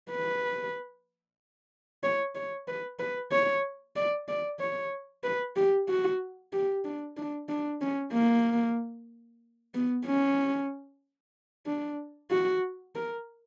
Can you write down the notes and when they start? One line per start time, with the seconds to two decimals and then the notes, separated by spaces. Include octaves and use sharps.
0.11 B4
2.04 C#5
2.35 C#5
2.68 B4
2.99 B4
3.32 C#5
3.96 D5
4.28 D5
4.60 C#5
5.24 B4
5.56 G4
5.89 F#4
6.53 G4
6.85 D4
7.17 D4
7.49 D4
7.81 C#4
8.13 A#3
9.74 B3
10.06 C#4
11.67 D4
12.31 F#4
12.95 A#4